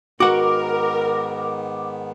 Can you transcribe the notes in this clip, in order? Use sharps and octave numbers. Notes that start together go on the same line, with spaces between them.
G#2 D#3 B3 F#4 A#4 F#5 D6